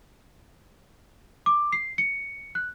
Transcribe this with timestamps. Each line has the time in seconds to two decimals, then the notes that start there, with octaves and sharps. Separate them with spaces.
1.46 D6
1.72 C7
1.98 C#7
2.55 F#6